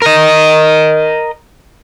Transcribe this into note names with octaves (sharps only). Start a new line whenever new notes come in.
A#4 D#5